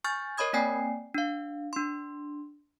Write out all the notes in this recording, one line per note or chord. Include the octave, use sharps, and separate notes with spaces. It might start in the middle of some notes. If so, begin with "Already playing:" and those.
G#5 C#6 F6 G6 A6
A#4 C#5 D#5 B5 D#6 G#6
A#3 C4 D5 G5 G#5 C7
D4 F5
D4 C6